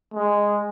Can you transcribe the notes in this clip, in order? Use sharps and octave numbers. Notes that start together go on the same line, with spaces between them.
G#3